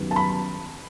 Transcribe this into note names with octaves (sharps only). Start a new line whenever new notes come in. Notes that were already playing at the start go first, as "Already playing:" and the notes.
Already playing: F#2 D#3 G3 B3
A5
B5